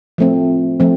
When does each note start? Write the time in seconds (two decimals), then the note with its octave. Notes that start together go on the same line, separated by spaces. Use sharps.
0.18 F3 A3 C4
0.80 F3 A3 C4